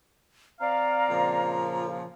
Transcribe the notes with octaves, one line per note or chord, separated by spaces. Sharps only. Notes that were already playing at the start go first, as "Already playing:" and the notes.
C4 D5 F5 A#5
A#2 C#3 F3